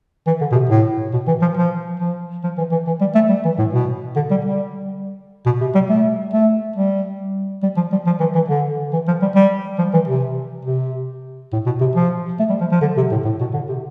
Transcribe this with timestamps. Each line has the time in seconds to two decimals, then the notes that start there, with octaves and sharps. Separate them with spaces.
0.27 E3
0.41 D3
0.52 B2
0.55 C3
0.69 A2
1.13 B2
1.27 E3
1.42 F3
1.57 F3
1.99 F3
2.44 F3
2.57 E3
2.71 E3
2.87 E3
3.01 G3
3.15 A3
3.29 G3
3.45 E3
3.59 A2
3.73 B2
4.16 D3
4.31 G3
4.45 G3
5.46 B2
5.61 C3
5.75 G3
5.89 A3
6.33 A3
6.76 G3
7.63 G3
7.77 F3
7.92 G3
8.07 F3
8.20 E3
8.35 E3
8.49 D3
8.93 E3
9.08 F3
9.22 G3
9.35 G3
9.79 F3
9.93 E3
10.08 C3
10.65 C3
11.53 A2
11.66 B2
11.81 C3
11.96 F3
12.40 A3
12.50 G3
12.61 F3
12.72 F3
12.82 D3
12.97 C3
13.11 A2
13.25 A2
13.41 B2
13.54 D3
13.69 C3